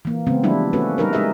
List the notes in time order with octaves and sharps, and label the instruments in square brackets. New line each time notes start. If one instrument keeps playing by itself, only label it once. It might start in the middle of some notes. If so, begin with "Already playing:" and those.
[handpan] E3 A#3
C#3 G#3 B3 C4
E3 F3 G3 A3 D4 E4
A#3 C#4 F#4 A4 B4
G3 D#4 A#4 B4
G#3 D#4 G#4 D#5 E5